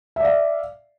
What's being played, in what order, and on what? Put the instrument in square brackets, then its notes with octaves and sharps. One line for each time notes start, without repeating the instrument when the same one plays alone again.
[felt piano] E5
D5
F5